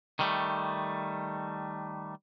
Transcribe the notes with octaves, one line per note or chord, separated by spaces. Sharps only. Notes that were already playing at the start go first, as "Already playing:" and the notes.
D#3 G3 A3